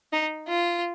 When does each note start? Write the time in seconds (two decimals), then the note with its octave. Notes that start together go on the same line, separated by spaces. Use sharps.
0.12 D#4
0.48 F4